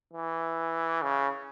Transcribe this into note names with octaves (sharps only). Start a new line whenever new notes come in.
E3
C#3